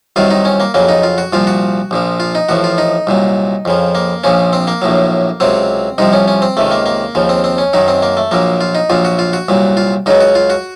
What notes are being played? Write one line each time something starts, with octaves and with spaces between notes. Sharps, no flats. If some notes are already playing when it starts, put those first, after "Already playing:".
C2 C3 D#3 F#3 F4
D#4
C#4
A#3
F2 C#3 F#3 A#3
D#4
F4
F#4
C2 A#2 F3 F4
F#4
A#1 A#2 F3
F4
D#4
A1 A2 F3 F#4
F4
D#4
C2 A#2 F#3
F2 C#3 F3
A#3
A#1 A#2 F3 C#4
C4
A#3
A#1 A2 F#3
C#2 C3 F#3 C4
C2 C3 F3 D#4
C#4
C#4
C4
C#2 C3 D#3 A3
A#3
A#3
D#2 C#3 F3
C4
C4
C#4
F#2 D#3 F#3 D#4
C4
A#3
A3
A#1 A#2 F#3 A#3
F4
D#4
A#1 A#2 F#3 F4
F#4
F4
F#4
C2 A#2 F#3
F4
C#2 C#3 F#3 D#4
F#4
F4
F#4